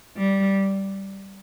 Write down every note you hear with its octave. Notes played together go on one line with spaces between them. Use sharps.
G3